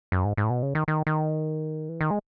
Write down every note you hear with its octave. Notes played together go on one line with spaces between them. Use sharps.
F#2
G#2
G#2
A2
B2
C#3
D#3
D#3
D#3
E3
D#3
G#3